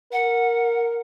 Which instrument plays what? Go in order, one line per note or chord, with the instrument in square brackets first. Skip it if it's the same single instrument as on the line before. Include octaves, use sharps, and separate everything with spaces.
[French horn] A#4 [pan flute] F#5